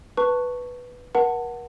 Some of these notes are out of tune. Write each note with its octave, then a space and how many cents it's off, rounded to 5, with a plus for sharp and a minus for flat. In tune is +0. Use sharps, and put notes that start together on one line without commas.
B4 +0 A5 +20 C#6 +0
A#4 +40 F#5 +0 A5 +25